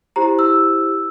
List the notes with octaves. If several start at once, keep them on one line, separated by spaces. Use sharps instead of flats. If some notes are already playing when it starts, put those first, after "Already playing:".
E4 G4 C5 A#5
E6